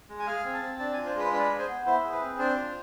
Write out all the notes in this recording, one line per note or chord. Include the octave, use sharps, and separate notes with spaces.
G#3
G#5
G#4 F5
C4
A5
C4
D4 A5
F4 G#5
C5
G#3 B4
D4 B4
G#4
C5
B3
E4 C5
G#4
B4
C4
D4 C5
F4